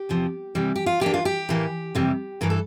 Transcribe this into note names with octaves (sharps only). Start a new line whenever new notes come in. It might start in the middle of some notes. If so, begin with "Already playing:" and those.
Already playing: G4
E2 C3 F3
C3 E3 G3
G4
F4
E3 A#3 D4 G4
F4
G4
A2 E3 A#3
F2 C3 E3 G3
G2 E3 A3 A#4
A4